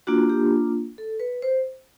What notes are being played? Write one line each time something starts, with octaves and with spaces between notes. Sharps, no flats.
A#3 D4 F4 F#4
G4
A4
B4
C5